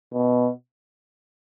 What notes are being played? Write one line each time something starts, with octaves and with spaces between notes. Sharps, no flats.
B2